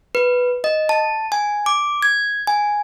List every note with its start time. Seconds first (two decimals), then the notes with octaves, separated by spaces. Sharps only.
0.15 B4
0.64 D#5
0.89 A5
1.32 G#5
1.66 D6
2.02 G#6
2.47 G#5